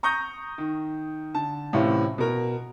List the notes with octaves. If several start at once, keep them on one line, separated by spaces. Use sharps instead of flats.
A#5 C#6 D#6 G6 A#6
D#3
D3 A5
A2 C3 E3 C#4 F4
B2 A#4